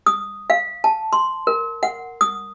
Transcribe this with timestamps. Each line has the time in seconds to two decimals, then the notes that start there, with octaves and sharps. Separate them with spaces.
0.06 D#6
0.50 F5
0.84 A5
1.13 C6
1.47 A#4
1.83 F#5
2.21 D#6